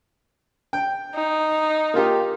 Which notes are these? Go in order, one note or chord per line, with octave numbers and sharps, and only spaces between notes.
G5
D#4
A#3 F4 G4